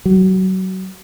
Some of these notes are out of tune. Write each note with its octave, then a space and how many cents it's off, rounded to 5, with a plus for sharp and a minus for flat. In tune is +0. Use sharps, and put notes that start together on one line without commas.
F#3 +25